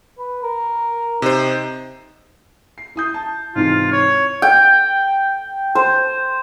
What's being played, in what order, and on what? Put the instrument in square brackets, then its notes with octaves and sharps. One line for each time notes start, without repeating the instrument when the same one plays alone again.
[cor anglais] B4
A#4
[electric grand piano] C3 C5 [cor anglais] D#4
[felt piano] C7
E4 D#6 G6
A5
[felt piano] G#2 C3 E3 [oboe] F4
[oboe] C#5
[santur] G5
C5